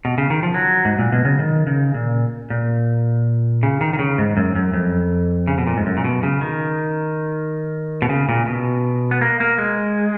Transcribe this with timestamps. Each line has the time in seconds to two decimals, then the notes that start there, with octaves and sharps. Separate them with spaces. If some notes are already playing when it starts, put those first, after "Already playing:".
0.05 B2
0.18 C#3
0.30 D#3
0.43 F3
0.54 F#3
0.85 G#2
0.99 A#2
1.12 B2
1.25 C#3
1.39 D#3
1.67 C#3
1.94 A#2
2.50 A#2
3.63 C#3
3.81 D#3
3.93 D#3
3.99 C#3
4.18 G#2
4.37 F#2
4.55 F#2
4.74 F2
5.47 C#3
5.58 B2
5.67 A#2
5.77 G#2
5.86 F#2
5.97 A#2
6.04 B2
6.23 C#3
6.41 D#3
8.02 B2
8.09 C#3
8.29 A#2
8.46 B2
9.11 B3
9.21 A#3
9.40 A#3
9.58 G#3